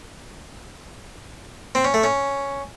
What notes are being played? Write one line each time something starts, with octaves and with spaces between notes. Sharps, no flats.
C4
C#4
A3
C#4